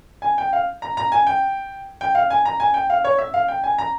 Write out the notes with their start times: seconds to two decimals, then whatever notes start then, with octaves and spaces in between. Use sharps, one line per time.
0.22 G#5
0.38 G5
0.53 F5
0.82 A#5
0.97 A#5
1.12 G#5
1.27 G5
2.01 G5
2.15 F5
2.30 G#5
2.45 A#5
2.60 G#5
2.74 G5
2.90 F5
3.04 C#5
3.18 E5
3.34 F5
3.48 G5
3.64 G#5
3.78 A#5